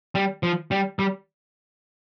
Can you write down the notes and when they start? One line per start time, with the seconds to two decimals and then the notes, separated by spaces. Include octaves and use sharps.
0.15 G3
0.43 F3
0.71 G3
0.99 G3